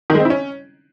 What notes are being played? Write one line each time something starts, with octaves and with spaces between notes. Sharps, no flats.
D#3
G#3
C4
E4
C#4